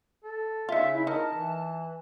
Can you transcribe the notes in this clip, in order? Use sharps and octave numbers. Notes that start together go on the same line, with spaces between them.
A4
C#3 D#4 F4 E5
E4
D#4 A#4 D#5 A5
E3